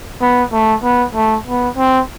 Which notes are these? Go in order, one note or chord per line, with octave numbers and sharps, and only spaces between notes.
B3
A3
B3
A3
B3
C4